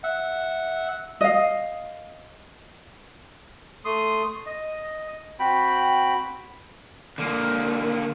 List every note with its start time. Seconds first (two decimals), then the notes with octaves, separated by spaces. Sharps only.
0.04 E5 F#5
1.21 D#5 F5
3.85 A3 C6 D#6
4.46 D#5
5.40 C4 F#4 G5 B5
7.18 D3 A#3